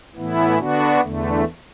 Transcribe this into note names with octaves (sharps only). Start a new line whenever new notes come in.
A2 E3 B3 E4
D3 B3 D4 F#4
E2 D3 A3